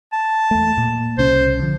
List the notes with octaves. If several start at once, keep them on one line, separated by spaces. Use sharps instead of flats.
A5
E2 A3
A#2
C2 C#3 C#4 C5
D3 F3